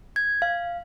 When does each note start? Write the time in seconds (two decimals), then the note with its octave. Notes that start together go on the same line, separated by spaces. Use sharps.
0.16 G#6
0.42 F5